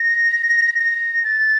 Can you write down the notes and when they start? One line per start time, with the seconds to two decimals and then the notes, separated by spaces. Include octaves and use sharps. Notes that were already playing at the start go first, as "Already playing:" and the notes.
Already playing: A#6
0.79 A#6
1.24 A6